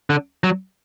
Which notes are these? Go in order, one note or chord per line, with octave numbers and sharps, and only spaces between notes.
D3
F#3